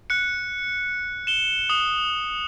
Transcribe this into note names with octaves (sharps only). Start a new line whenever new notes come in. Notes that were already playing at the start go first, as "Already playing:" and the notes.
F#6 C#7
E7 G7
D#6